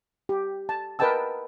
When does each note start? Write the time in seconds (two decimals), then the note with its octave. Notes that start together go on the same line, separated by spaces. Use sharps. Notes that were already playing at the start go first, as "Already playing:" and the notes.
0.29 G4
0.69 A5
0.99 A#4 B4 D#5 G5 A5 E6